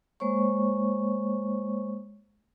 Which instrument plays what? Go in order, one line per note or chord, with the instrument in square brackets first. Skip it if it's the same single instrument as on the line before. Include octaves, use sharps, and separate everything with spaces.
[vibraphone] G#3 A#3 C5 C#5 C#6